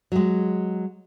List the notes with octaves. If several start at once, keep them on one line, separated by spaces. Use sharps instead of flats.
F#3 G#3